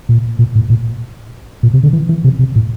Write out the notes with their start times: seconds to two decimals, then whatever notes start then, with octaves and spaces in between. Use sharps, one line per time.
0.09 A#2
0.39 A#2
0.55 A2
0.70 A#2
1.63 A#2
1.73 C3
1.83 D3
1.93 E3
2.09 E3
2.24 C3
2.39 C3
2.55 A2